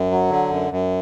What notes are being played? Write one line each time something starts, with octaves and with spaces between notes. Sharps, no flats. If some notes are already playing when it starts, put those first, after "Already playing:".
Already playing: F#2
F#3
D3
F#2
F#2